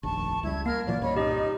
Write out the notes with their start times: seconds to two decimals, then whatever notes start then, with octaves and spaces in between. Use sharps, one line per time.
0.03 F1 A#1 D#2 A5 C#6
0.43 C#2 G3 E4 G#6
0.66 A#3 A#4 F6 G#6
0.87 A#2 E3 F#3 D5
1.02 C2 G2 A#2 C#5 D#5 B5
1.16 C#4 D#4 G4 D#5